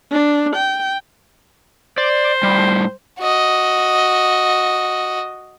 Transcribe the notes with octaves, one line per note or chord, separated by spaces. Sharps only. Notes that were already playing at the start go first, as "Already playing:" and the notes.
D4
G5
C5 D5
A2 G3
F#4 D#5